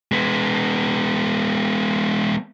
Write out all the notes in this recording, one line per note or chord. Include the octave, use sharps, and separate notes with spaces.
G#3 B3